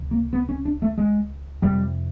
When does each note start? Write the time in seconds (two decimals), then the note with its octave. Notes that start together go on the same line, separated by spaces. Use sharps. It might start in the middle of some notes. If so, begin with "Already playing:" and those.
Already playing: C#2 C3
0.11 A#3
0.33 B3
0.49 C#4
0.65 D4
0.82 A3
0.98 G#3
1.62 F2 C3 G3